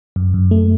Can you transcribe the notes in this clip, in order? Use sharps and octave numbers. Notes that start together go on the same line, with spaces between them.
F#2
F#2
A3